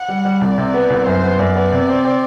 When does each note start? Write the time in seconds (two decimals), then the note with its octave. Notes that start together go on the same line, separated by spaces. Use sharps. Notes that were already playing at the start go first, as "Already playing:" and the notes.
Already playing: F#5
0.09 G3
0.25 G3
0.41 C2 D5
0.58 C3
0.74 B3
0.90 C2
1.06 F#2 C5
1.23 B3
1.39 F#2 D5
1.55 B3
1.72 C3
1.89 C4
2.05 C4